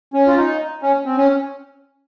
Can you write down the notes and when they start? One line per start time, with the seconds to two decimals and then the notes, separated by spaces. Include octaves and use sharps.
0.14 C#4
0.27 F4
0.37 D#4
0.82 C#4
1.06 C4
1.17 C#4